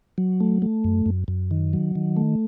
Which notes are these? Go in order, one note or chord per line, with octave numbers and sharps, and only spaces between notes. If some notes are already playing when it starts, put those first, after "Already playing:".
F#3
A3
A3
F#2
F#2
F#2
D#3
F#3
D#3
A3